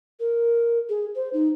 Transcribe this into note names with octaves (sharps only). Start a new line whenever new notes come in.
A#4
G#4
C5
D#4